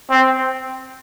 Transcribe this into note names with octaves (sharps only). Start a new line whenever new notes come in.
C4